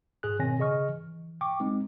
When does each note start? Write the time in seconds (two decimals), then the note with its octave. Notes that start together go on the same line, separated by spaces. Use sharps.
0.23 G#2 G#4 F#6
0.39 B2 D#3 C4 C#5 G#5 A#6
0.59 C#3 G#4 D#5 C#6 F6
0.89 E3
1.41 G5 C#6 D6
1.60 G#3 C4 D#4